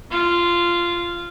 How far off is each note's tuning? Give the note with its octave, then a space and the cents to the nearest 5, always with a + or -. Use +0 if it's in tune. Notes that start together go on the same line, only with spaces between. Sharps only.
F4 -10